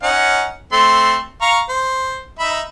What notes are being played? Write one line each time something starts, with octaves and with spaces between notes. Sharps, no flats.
C#4 D#4 F#5
A3 C4 C6
F5 A#5 C#6
C5
D#4 E5 B5